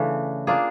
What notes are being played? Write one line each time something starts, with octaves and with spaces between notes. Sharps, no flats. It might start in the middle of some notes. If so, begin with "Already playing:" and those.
Already playing: C#3 E3 A3 D4
A#3 D4 F4 G#4